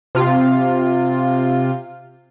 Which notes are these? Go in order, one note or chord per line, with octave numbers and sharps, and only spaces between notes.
C3 F4